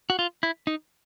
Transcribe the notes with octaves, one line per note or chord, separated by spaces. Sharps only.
F#4
F4
E4
D#4